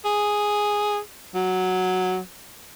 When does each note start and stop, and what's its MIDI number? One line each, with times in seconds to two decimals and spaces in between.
0.05 0.99 68
1.35 2.18 54